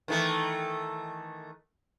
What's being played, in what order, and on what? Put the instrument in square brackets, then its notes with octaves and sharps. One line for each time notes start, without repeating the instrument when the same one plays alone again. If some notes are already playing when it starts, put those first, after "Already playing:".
[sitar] D#3 E3 A3